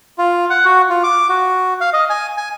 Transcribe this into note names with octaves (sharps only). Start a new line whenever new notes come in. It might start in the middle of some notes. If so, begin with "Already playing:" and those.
F4
F#5
F#4
F4
D6
F#4
F5
D#5
G#5
G#5